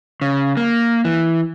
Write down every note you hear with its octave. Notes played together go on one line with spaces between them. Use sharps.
C#3
A#3
E3